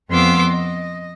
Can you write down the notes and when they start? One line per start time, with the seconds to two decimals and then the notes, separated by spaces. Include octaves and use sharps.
0.10 F2 B3 F5 C6 D6 E6
0.51 D#5